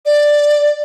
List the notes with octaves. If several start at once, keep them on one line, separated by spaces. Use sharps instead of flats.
D5